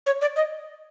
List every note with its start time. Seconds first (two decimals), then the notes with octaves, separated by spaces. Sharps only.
0.06 C#5
0.21 D5
0.36 D#5